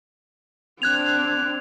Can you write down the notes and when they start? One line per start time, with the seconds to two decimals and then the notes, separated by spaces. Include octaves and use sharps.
0.82 C4 D4 F#6 G#6 F7